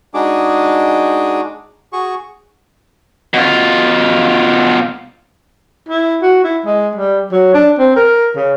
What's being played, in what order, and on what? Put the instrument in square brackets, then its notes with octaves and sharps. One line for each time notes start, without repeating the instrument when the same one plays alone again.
[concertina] G#3 D4 D#4 F#4 G#4 D6
F#4 G#4 C#6
[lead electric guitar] B2 F4
[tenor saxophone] E4
F#4
E4
G#3
G3
F#3
D4
C4
A#4
C#3